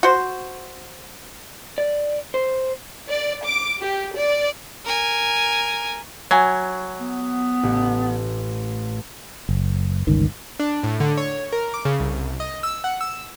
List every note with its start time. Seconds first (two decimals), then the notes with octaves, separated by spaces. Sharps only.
0.03 F#4 C5
1.78 D5
2.34 C5
3.07 D5
3.44 D6
3.81 G4
4.16 D5
4.85 A#4 G#5
6.31 F#3 G#5
7.00 B3
7.63 A1
9.49 F#1
10.07 G1 C#2 D#3
10.59 D4
10.84 A2
11.00 D3
11.17 C#5
11.52 A#4
11.74 D6
11.85 C#3
12.00 C2
12.40 D#5
12.63 E6
12.84 F#5
13.01 E6